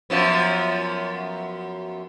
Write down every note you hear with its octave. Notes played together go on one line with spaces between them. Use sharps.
F#2 F3 B3